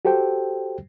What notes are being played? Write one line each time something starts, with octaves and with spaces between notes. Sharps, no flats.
F#4 G4 A4 C5 G5